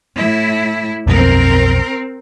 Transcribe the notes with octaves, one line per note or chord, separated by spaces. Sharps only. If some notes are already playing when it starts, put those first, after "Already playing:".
A2 E4
B1 F2 C4 A#4